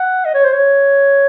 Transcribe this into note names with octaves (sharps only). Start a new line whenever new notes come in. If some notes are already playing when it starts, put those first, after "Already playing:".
Already playing: F#5
D#5
C#5
C5
C#5